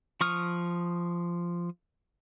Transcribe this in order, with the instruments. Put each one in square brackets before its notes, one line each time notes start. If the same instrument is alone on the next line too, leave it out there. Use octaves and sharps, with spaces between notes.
[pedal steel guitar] F3 C#6 D#6 F6